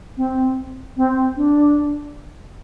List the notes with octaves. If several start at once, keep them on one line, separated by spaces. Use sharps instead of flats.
C4
C4
D4